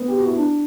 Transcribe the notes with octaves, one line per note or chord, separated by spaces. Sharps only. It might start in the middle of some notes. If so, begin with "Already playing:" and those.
Already playing: B3
G4
F#4
E4
D4